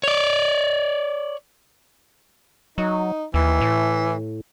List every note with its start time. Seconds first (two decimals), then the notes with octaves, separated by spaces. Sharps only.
0.03 C#5 D5
2.78 F#3 D#4
3.34 D#2 E3
3.61 A2